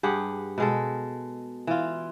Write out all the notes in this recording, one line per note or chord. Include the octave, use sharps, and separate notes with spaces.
G2 G4 G#4 F#5
B2 G#3 A4
E3 F4